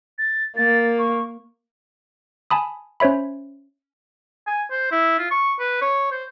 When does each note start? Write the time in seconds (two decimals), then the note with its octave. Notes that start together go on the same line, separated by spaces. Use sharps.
0.18 A6
0.57 A#3 A6
0.99 C#6
2.51 G#5 A5 B5 D#6
3.00 C#4 C5 C#5 E5 B5
4.47 G#5
4.71 C5
4.92 E4
5.19 F4
5.31 C#6
5.60 B4
5.82 C#5
6.11 C5